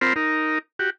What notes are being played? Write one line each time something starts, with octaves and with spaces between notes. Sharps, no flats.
C4 F4 A#4 C5 B5
D#4 A#4
F#4 G4